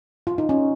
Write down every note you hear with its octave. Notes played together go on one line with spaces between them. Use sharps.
F4
D#4
C#4